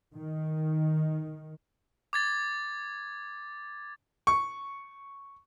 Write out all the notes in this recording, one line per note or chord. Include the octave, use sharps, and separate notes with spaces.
D#3
D6 G#6 A6
C#6